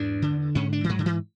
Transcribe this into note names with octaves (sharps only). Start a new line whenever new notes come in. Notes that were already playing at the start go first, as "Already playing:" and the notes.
Already playing: E2 G#2 D4
D3
G#2 C#4
D4
E3
G#2 F#3
D3
E3